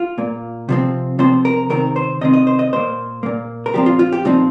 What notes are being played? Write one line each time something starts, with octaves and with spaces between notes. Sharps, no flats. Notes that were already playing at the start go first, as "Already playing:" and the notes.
Already playing: F4
A#2 A#3
C3 F3 C4
C3 F3 C4 C5
A#4
C3 D#3 C4 A#4
C5
C3 D#3 C4 D#5
D#5
C5
D#5
A#2 A#3 C5
A#2 A#3
A#4
A#2 F3 C4 G4
F4
F4
G4
A#2 F3 C4 D#4